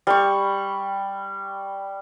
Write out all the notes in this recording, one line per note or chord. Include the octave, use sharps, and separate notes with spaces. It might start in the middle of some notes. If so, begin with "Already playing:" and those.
G3 C#6